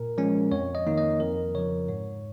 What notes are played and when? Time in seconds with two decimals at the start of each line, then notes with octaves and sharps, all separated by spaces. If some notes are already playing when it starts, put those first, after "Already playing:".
Already playing: A#2 A#4
0.18 F3 G#3 C#4
0.52 F2 C#5
0.75 D#5
0.87 D#3 A#3 D#4
0.98 D#5
1.20 F2 A#4
1.55 C#3 F3 C#5
1.88 G#2 C#5